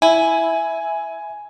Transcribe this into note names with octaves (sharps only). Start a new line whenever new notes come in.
E4 G#5